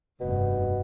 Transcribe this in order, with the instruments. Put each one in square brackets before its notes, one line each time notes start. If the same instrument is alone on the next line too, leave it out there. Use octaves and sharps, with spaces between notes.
[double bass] F1 G2 [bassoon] B2